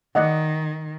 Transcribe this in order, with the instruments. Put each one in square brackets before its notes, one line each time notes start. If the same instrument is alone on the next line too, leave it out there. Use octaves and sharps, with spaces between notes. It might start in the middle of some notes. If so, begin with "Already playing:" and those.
[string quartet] D#3 [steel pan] D5 D#5 F#5